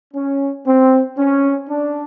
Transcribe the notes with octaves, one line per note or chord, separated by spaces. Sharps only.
C#4
C4
C#4
D4